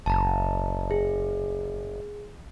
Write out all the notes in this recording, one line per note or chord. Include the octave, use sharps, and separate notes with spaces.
F#1 A5 A#5
G#4